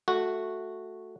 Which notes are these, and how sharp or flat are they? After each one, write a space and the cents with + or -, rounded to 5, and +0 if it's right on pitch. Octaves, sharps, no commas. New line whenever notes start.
A3 +0 F#4 -5